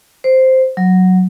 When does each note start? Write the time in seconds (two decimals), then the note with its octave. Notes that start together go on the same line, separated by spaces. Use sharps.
0.24 C5
0.77 F#3